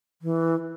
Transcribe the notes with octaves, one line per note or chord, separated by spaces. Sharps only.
E3